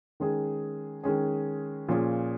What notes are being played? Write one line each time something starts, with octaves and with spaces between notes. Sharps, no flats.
D#3 G#3 C#4 G#4
D#3 G#3 C#4 G#4
A#2 F3 C#4 F4 G#4